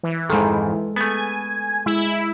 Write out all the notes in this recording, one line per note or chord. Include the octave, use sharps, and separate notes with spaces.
E3
F2 G#2 D#3 G#3 A4
A3 B3 G#5
G#3 E4